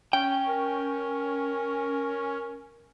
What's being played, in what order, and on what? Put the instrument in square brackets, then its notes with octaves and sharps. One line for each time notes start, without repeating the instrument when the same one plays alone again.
[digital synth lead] C#4 [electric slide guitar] G5
[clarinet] A#4